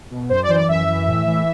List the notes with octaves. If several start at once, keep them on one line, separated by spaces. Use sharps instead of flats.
B2
F#2 C5
D5
E3 C5
D5
F#2 E5
E3
A2
E3